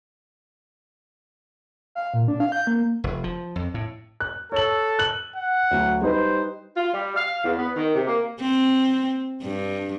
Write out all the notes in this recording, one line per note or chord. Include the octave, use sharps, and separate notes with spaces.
F5
A#2
D4
F5
G6
A#3
F1
F3
F2
A2
F#6
A4 C#5 F#7
F#6 F#7
F#5
D2 F#3
G3 D#4 B4 C5
F4
G3
F5
E2
B3
D#3
C3
A#3
C4
G2